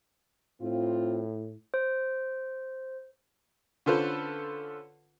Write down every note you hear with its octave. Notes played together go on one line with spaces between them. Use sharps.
A2 C4 F4
C5
D3 C#4 F4 A4 B4 C5